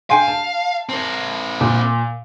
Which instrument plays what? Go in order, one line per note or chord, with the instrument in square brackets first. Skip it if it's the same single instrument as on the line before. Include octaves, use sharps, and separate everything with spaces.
[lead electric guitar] F5 [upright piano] G5 G#5 C6
[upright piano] A5
[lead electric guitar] C4 A#4
[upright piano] A#2